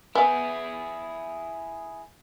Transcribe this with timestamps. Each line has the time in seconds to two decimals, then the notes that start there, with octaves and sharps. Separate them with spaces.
0.15 B3 E4 G#4 G#5